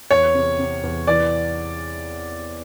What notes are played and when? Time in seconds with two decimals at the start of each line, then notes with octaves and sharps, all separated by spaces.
0.10 E2 C#5
0.35 C3
0.59 C3
0.83 E2
1.07 E3 D5